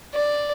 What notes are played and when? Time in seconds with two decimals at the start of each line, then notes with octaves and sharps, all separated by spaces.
0.15 D5